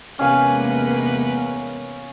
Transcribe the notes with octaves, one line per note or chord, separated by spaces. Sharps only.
E2 C3 G#3 A#3 C#4 B4 F5 G#5